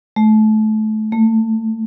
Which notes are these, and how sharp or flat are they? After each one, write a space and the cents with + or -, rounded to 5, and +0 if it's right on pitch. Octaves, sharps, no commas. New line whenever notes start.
A3 -25
A3 +25